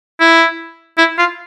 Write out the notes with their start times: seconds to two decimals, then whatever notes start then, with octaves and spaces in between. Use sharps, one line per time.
0.20 E4
0.98 E4
1.18 F4